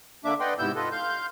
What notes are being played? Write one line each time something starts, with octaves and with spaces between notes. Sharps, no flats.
D3 A#3 D4 E5 D6
B4 D5 D#5 F#5 G5 C6
G#2 C3 B3 E4 E6 G6
F4 A4 B4 D#5
F5 C6 G6